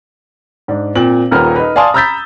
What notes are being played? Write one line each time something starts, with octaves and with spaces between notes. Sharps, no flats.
G#2 D4
A#2 C4 F#7
D#1 D#2 A#2 A#4 B4 F6
D#4 B4
D5 F5 G#5 A5 C6 D#6
A#5 B5 E6 G6 A6 B6